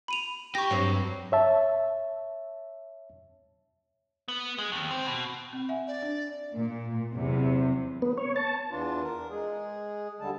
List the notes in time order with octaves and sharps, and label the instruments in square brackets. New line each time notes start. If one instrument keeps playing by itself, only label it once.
[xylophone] B5 D#7 F7
[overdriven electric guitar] G4 [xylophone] C#6 A#6
[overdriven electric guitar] G2 [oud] F#3 C4
[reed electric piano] C#5 E5 A5
[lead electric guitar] B3
G#3
D#2
C4
B2
[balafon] C4
E5 F#5 G#5
[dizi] D5
[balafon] D4
[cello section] A#2
E2 C3 F#3
[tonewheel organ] B3
C#5
A5
[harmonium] E2 E3 D4 F4
A#4
G#3 G#4
D#2 D3 G3 A5